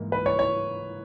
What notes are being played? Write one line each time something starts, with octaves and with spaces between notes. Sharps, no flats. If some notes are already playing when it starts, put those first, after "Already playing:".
Already playing: G#2 E3 A#3
B4
C#5
C#5